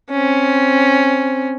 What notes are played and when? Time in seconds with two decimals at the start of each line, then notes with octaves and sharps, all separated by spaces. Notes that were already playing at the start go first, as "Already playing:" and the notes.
0.10 C4 C#4